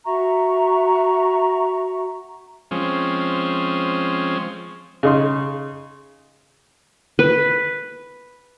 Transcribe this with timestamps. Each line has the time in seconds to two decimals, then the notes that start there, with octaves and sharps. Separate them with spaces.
0.06 F#4 E5 A#5 C#6
2.71 F3 G#3 C4 C#4
5.03 C#3 D#4 C6
7.19 B4